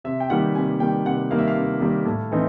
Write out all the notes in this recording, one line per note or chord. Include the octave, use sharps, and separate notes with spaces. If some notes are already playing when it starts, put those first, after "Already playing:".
C3 E5
G5
D#3 G3 A#3 F#5
C3 G#5
D#3 G3 A#3 G5
C3 F#5
D#3 G3 A#3 F5
E5
F5
C3
D#3 G3 A#3
A2
E3 A3 C4 D#4